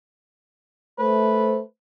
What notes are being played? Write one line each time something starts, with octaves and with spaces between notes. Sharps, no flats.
A3 B4 C5